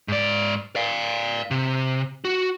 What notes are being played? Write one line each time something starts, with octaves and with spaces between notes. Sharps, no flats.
G#2 D5
D5 F5
C3
F#4